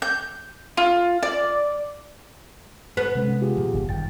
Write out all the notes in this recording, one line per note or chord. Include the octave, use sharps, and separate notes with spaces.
G6
F4
D5
B3
C3 G#3 C#4
F4 G4 G#4
G2 A#2 F3
G1
F#2 D#3 G5 A6